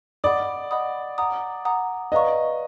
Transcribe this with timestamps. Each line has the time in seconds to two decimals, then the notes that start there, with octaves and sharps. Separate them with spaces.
0.24 D5 D#5 F#5 B5 D#6
0.71 D#5 F#5 B5 D#6
1.18 F#5 A#5 D#6
1.65 F#5 A#5 D#6
2.12 B4 D5 D#5 F5 A#5 C#6